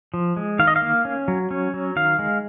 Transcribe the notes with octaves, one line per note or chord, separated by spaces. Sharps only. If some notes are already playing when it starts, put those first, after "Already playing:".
F3
G#3
D#3 F5
D#5
F5
A#3
C#4
F#3
C#4
F#3
D#3 F5
G#3